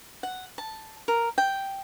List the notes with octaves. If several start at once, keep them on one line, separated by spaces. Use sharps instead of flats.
F#5
A5
A#4
G5